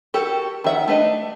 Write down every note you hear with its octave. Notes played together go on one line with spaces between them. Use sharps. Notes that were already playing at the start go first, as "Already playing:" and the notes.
F#4 G4 A4 A#4
D#3 E5 F#5
A3 D4 B4 D#5